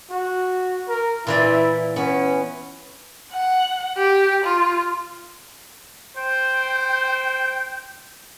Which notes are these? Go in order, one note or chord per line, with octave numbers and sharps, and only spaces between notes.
F#4
A#4
A#2 E3 E4 D5
B3 C#4
F#5
G4
F4
C5 G5